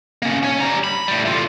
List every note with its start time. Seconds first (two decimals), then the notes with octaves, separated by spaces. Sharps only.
0.22 A#3 C#4
0.43 C#4 C#5
0.60 G3 A#5
0.84 B5
1.08 A2 G3
1.25 D3 F4